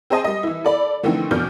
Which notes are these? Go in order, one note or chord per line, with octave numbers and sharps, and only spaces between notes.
C4 G#4 C5 D#5 G#5 A5
G3 D#5
E3 E4
A4 D5 B5
D3 E3 F3 A3 C4 D#4
F1 B2 D4 F6 G6